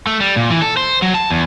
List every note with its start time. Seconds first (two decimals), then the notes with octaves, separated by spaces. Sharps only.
0.07 A3
0.20 G3
0.36 A#2
0.50 E3
0.62 A4
0.77 C5
1.02 F#3
1.14 A5
1.30 E2